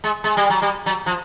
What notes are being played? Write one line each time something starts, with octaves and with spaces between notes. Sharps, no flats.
G#3
G#3
G3
F#3
G3
F#3
F3